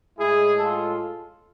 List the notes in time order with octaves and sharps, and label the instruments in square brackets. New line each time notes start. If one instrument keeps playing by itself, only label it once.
[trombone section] A2 G#3 E4 G#4
F4 A4